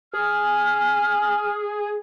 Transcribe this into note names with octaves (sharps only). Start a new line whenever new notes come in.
G#4 F6